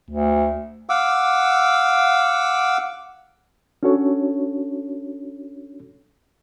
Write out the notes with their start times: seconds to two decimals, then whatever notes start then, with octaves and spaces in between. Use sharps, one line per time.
0.10 D2
0.89 F5 F#5 D6 E6
3.83 C#4 D4 F#4 A4 C#5